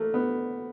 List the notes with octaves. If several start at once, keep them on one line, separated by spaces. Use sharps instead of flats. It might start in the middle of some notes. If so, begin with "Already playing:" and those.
Already playing: A3 A#3
B3